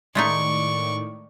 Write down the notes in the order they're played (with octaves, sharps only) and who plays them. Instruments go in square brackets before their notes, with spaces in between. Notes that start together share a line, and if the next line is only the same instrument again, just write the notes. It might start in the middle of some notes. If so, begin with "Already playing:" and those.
[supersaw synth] A2 D#3 [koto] G#3 A3 D#4 [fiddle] D5 C#6